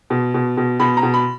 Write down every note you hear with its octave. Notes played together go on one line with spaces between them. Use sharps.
B2
B2
B2
B2 B5
A#5
B2
B5